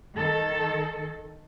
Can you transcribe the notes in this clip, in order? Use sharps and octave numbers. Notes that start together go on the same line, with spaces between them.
D#3 A4